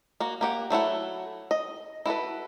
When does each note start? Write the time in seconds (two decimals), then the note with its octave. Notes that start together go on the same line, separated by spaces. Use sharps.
0.20 A#3 F#4
0.41 A#3 G4 F#5
0.70 F#3 A3 E4 F#5
1.51 D#5
2.06 E4 F#4 A4 B4